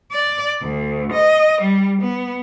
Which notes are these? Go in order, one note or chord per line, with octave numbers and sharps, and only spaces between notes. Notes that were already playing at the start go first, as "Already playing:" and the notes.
D5
D2
D#5
G3
B3